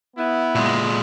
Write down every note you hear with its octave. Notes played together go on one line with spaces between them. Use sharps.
B3 E4
A#2 G#3